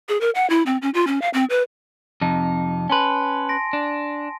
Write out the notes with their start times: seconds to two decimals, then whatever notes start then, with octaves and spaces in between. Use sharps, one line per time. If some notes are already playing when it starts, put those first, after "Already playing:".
0.09 G#4
0.21 A#4
0.35 F#5
0.50 E4
0.66 C4
0.82 C#4
0.94 F4
1.07 C#4
1.22 F5
1.34 C4
1.50 B4
2.21 F2 C3 D#4 A5
2.90 C#4 B4 G#5 A5 C6
3.49 C6 A#6 D7
3.73 D4